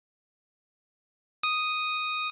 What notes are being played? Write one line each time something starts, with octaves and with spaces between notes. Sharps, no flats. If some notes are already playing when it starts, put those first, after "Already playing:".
D#6